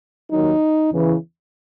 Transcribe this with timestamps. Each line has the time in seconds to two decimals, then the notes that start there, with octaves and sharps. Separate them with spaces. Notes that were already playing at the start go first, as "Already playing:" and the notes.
0.31 D#2 D#3 F#3 D#4
0.92 E2 C#3 E3